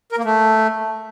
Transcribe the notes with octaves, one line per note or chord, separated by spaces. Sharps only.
A#4
A#3
A3